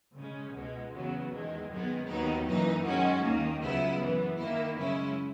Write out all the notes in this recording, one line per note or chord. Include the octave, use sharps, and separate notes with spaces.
C#3 G#3 C#4
C#2 B2 G#3
E2 C#3 F#3 B3
E2 D#3 G#3
F#2 D#3 G#3 B3
D#2 D#3 F#3 B3 D#4
F#2 E3 A#3 D#4
F#2 D#3 G#3 C#4 F#4
D#2 D#3 A#3
C#2 C#3 F#3 B3 E4
F#2 E3 B3
D#3 A#3 E4
F#2 C#3 G#3 C#4 E4